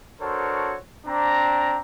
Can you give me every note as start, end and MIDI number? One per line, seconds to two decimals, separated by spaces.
0.21 0.76 62
0.21 0.76 66
0.21 0.76 69
0.21 0.76 70
0.21 0.76 72
0.21 0.76 73
1.07 1.80 60
1.07 1.80 62
1.07 1.80 82